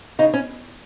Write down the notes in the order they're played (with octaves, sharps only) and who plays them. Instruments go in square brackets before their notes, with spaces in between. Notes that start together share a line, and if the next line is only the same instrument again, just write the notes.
[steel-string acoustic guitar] C#3 D#4
C#4